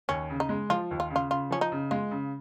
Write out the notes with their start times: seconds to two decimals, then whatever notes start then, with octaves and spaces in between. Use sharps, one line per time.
0.09 D#2 C#4
0.30 C#3
0.40 D#4
0.49 G#3
0.70 F3 F4
0.91 D#2
1.00 F4
1.10 C#3
1.16 F4
1.31 C#3 F4
1.51 F3 C#4
1.61 D#4
1.72 C#3
1.91 G#3 F4
2.11 C#3